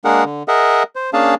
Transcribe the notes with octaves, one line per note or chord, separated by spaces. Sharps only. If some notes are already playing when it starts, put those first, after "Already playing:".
G#3 A#3 D4 G#4 A#4 F#5
D3
G#4 A#4 D#5 E5 F#5
C5
A#3 C#4 D4 G#4 F5 A5